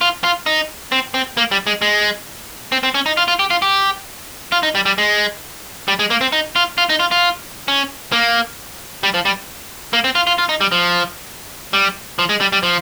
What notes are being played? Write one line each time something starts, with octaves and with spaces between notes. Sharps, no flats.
F4
F4
D#4
C4
C4
A#3
G3
G#3
G#3
C4
C4
C#4
D#4
F4
F4
G4
F4
G4
F4
D#4
G3
G3
G#3
G3
G#3
A#3
C4
D#4
F4
F4
D#4
F4
F4
C#4
A#3
G3
F3
G3
A#3
C4
F4
F4
F4
D#4
G3
F3
G3
F3
G#3
G3
G3
F3